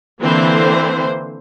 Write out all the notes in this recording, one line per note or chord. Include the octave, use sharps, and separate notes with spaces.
D3 E3 A#3 C4 E4 C5